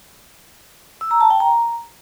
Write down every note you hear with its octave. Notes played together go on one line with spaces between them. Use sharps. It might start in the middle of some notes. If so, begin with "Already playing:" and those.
E6
A#5
A5
G5
A#5